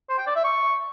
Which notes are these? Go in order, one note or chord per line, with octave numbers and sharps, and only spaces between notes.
C5
G5
D5
E5
C#6